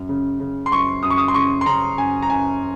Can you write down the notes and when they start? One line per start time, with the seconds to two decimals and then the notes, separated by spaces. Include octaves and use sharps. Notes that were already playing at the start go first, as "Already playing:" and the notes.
Already playing: F#2
0.09 C#3
0.40 C#3
0.66 C6
0.72 F#2 C#6
1.03 F#2 D#6
1.10 C#6
1.18 D#6
1.28 C6
1.34 C#3 C#6
1.61 C6
1.66 C#3 A#5
1.98 F#2 G#5
2.22 A#5
2.29 F#2 G#5